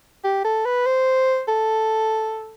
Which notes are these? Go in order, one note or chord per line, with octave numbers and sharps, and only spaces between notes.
G4
A4
B4
C5
A4